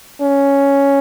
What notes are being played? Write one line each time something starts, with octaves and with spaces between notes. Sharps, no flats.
C#4